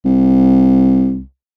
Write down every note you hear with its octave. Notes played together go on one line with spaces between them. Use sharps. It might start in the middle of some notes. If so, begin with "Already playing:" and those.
C2